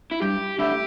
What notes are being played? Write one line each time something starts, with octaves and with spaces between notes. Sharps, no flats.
E4
G2 G4
D3 A3 E4 G4